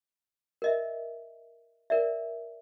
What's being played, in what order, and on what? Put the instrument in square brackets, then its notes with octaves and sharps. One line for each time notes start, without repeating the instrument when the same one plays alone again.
[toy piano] A#4 D#5 E5
A#4 D5 E5